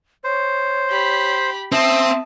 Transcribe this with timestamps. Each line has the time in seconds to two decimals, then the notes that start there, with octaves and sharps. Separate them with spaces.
0.24 C5 C#5
0.90 G4 B5
1.72 C4 E5 A5 D#6